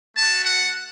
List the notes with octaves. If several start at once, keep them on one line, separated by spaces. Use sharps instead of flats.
A3 F#4 A5
F#5